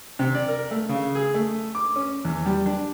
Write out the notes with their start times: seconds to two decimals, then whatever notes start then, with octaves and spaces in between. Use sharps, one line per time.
0.19 C3
0.35 D5
0.48 A#4
0.71 A3
0.89 C#3
1.15 G#4
1.34 A3
1.75 D6
1.96 C#4
2.25 E2
2.45 G3
2.66 D4